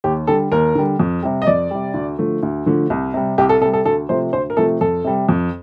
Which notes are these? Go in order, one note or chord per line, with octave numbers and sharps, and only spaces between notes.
D#2 G4
D3 G3 A4
D#2 A#4
D3 G3
F2
C3 G3
D#5
F2 D5
C3 G3
D2
D3 F3 A3
D2
D3 F3 A3
C2
C3 G3
C2 G4
A4
C3 G3 A4
A4
D2 A4
C3 F3 A3 C5
D2 C5
A#4
C3 F3 A3 A4
F2 A4
C3 G3
F2